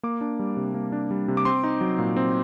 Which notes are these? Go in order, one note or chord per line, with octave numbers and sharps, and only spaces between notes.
A#3 D6
D4
G3
C3
A#3
D4
G3
C3
D6
C4 C6
D#4
F#3
A#2
C4